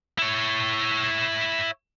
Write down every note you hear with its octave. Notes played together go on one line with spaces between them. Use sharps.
E4 C#5